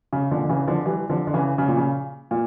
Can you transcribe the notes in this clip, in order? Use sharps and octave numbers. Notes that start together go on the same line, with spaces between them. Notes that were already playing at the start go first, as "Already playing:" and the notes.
C#3
A#2 D3
D3
C#3 E3
D3 F3
E3 G3
D3 F3
D3
C#3 E3
C#3
A#2
C#3
A#2